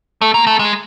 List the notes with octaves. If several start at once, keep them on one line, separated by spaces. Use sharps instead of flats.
A3
A#3
A3
G#3